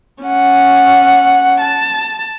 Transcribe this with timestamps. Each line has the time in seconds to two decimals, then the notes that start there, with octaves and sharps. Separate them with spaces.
0.23 C#4 F#5
1.61 A5